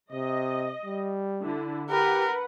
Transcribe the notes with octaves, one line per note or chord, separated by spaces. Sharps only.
C3 D#5
G3
D3 E4
G4 A#4 B4 F#5